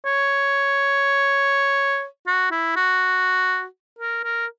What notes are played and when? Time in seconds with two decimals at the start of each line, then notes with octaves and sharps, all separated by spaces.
0.05 C#5
2.27 F#4
2.51 E4
2.76 F#4
3.99 A#4
4.24 A#4